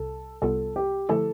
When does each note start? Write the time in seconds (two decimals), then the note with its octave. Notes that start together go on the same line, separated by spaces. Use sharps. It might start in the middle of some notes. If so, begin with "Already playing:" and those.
Already playing: C2 C3 A4
0.42 C2 C3 G3 B3 F4 A4
0.76 G4
1.09 D3 F3 A3 E4 G4 A4